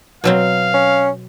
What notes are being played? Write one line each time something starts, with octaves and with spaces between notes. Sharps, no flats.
B2 F#3 C4 F5
C#4